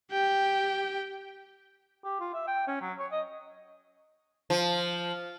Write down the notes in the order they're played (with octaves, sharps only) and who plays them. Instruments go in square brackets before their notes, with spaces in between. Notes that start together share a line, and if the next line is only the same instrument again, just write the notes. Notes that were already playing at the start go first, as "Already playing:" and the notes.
[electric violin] G4 G5
[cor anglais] G4
F4
E5
G5
C#4
F#3
C#5
D#5
[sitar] F3